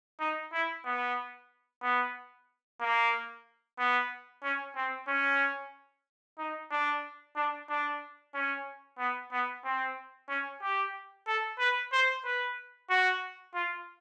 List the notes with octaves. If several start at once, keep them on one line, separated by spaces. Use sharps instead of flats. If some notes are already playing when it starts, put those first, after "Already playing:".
D#4
E4
B3
B3
A#3
B3
C#4
C4
C#4
D#4
D4
D4
D4
C#4
B3
B3
C4
C#4
G4
A4
B4
C5
B4
F#4
F4